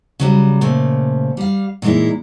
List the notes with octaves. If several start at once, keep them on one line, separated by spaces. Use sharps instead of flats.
C#3 F#3 G3
A#2 C#3 F3 A3
G3 F5
A#2 E3 G#3 D#4 E4